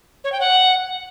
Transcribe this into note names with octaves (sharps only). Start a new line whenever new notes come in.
C#5
G5
F#5